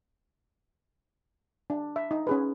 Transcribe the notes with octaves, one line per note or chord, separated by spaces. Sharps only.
D4
E5
D#4
C#4 G#4 B4